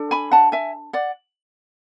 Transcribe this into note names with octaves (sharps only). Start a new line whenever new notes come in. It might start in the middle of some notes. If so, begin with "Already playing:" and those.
Already playing: D4 A4
G#5 B5
F#5 A5
E5 G#5
D5 F#5